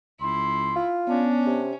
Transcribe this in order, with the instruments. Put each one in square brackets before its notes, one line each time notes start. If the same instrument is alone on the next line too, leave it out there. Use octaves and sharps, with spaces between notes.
[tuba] C#2 [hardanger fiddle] E4 [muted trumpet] C6
[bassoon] F4
[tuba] B3 [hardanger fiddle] C#4 [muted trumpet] D4
[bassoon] C3